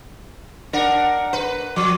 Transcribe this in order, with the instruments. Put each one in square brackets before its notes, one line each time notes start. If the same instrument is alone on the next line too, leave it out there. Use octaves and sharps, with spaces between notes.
[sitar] D4 A#4 [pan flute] F#5
[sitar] B4
[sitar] F3 [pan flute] D6